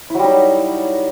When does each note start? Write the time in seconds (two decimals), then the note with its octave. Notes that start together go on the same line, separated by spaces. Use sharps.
0.10 E4
0.15 F#3
0.19 G3
0.24 D#4